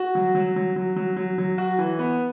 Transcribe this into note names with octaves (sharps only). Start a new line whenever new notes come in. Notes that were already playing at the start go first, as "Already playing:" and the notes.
Already playing: F#4
F#3
F#3
F#3
F#3
F#3
F#3
F#3
F#4
E3
B3